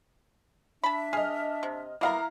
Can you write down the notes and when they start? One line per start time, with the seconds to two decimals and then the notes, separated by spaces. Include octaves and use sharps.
0.83 D4 E5 A5 B5
1.13 G#4 D#5 F6
1.63 C3
2.01 A#3 B3 E4 A#4 F5 A#5